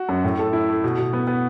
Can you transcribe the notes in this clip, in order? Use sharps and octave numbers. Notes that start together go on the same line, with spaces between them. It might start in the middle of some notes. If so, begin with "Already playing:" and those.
Already playing: F#4
F#2
A2
A4
E4
A3
B2
B2
B3
B3